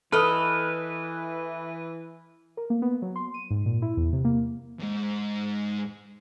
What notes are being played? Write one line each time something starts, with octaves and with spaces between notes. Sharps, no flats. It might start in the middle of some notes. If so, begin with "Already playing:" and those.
E3 A4 B4 D#5 D#6 F6
A#4
A#3
B3
F#3
C6
D#7
G#2
A#2
E4
E2
C3
A#3
E2 G#2